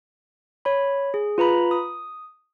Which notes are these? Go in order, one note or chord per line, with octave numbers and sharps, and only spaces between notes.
C#5 B5
G#4
F4 B4 A#5 B5
D#6